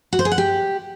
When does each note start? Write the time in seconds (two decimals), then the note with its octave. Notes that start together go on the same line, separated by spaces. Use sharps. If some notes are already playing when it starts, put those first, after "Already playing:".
0.13 F#4
0.19 C5
0.25 G#4
0.32 F#5
0.38 G4